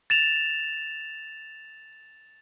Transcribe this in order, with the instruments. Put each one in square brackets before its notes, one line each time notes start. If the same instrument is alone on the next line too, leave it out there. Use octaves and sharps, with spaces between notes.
[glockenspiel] A6 E7 F7